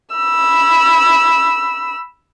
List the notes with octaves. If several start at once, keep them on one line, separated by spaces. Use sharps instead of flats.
B5 E6